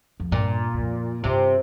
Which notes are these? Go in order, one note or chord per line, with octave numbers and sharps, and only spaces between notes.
F2
G2 A#2
G2
F2
G2 C3